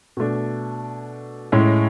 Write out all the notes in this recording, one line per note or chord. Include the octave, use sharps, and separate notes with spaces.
B2 A3 D4
A2 G#3 C#4 E4